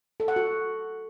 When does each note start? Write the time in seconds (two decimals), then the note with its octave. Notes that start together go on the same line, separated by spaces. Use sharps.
0.20 A4
0.28 F#5
0.36 F#4